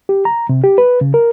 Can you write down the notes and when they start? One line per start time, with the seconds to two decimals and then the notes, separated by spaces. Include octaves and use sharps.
0.09 G4
0.25 A#5
0.49 C3
0.64 G4
0.78 B4
1.01 C#3
1.14 A#4